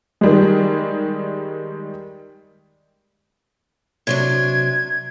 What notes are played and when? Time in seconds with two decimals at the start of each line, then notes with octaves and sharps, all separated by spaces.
0.21 D#3 G3 G#3
4.07 C3 F#3 D4 G#6